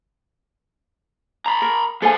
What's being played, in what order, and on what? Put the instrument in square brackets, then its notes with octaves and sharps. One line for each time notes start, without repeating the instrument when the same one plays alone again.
[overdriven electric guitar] A#5 B5
[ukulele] A#4
[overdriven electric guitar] E3 C5 [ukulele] A4 G#5